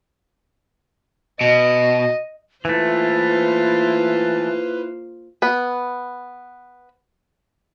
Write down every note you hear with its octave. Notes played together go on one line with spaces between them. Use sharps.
B2 D#5
E3 A3 A#3 E4 F4 B4 C5
B3 B4